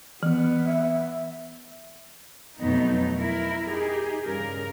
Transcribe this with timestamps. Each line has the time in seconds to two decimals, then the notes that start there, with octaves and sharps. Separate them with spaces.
0.23 E3 B3
0.66 E5
2.60 F2 B2 F#3 A3 B3 D#4
3.17 E4 A#4
3.68 D#4 G4 G#4
4.24 G2 C#3 A#4